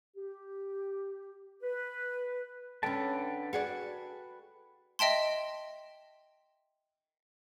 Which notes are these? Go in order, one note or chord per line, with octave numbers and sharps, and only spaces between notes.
G4
B4
D3 C#4 B4 G5 A5
F#4 G#4 D5
D#5 E5 G5 A5 C6